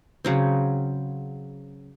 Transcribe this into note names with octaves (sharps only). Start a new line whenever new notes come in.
C#3 F#3 C4